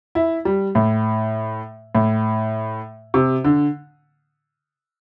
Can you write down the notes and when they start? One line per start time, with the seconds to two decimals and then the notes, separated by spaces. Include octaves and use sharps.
0.15 E4
0.45 G3
0.75 A2
1.95 A2
3.14 C3
3.44 D3